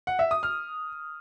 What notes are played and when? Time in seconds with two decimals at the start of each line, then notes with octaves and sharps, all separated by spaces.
0.07 F#5
0.19 E5
0.31 D#6
0.43 F6